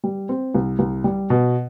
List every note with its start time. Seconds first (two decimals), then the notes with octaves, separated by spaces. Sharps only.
0.04 G3
0.29 C4
0.55 C2
0.79 C2
1.04 G3
1.30 B2